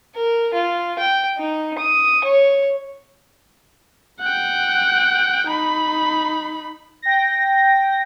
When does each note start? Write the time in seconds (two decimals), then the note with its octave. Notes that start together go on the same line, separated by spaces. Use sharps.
0.15 A#4
0.54 F4
0.99 G5
1.38 D#4
1.78 D#6
2.24 C#5
4.21 F#5 G5
5.49 D#4 B5
7.02 G5 A#6